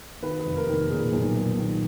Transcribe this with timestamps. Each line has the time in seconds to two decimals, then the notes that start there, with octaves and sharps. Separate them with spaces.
0.22 D#3 B4
0.40 B4
0.45 F1
0.56 A#4
0.68 D#3
0.73 A#4
0.90 A#2 G#4
1.13 B1
1.35 A#2
1.58 D#3